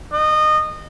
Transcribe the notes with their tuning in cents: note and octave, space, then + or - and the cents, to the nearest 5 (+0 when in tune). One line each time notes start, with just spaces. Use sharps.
D#5 -25